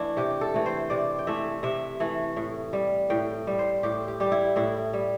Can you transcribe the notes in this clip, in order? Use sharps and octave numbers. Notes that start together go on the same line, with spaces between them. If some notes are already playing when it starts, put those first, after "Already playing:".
Already playing: E3 A3 D4 E4
C3 G4
A4
E3 A3
C5
C3 D5
G5
E3 A3 E5
C3 E5
E3 A3
A2
G3
A2 G5
G3
C5
A2 G4
G4
G3 G4
E4
A2 E4
G3